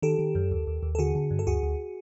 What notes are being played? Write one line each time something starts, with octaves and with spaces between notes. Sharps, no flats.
D#3 G4 A4
D#3
F#2
D#2
D#2
D#2
A4
D3 F#4 G#4
D3
G2
A4
D2 F#4 G#4
D2